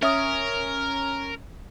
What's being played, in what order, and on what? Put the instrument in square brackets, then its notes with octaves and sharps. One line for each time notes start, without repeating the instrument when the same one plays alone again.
[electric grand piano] C#4 [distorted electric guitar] A#4 [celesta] E5 D#6